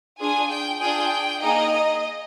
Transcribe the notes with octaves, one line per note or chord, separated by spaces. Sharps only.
D4 F4 G#4 G#5
G5
D4 F4 G#4 G5
A#3 D#4 G#4 D#5